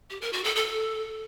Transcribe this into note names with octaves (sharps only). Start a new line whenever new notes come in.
G4
A#4
F#4
A4
A4